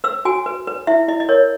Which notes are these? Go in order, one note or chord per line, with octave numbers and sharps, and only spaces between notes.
B4 E6
F#4 G#5
B4
B4
E4 E5
E4 D#5
D#5
A#4 C#5